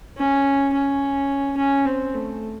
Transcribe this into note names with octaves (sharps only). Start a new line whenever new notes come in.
C#4
C#4
C#4
C4
A3